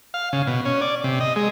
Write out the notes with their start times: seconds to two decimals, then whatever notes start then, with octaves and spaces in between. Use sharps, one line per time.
0.14 F5
0.33 C#3
0.47 B2
0.65 C#4
0.81 D5
1.04 C3
1.20 D#5
1.36 G#3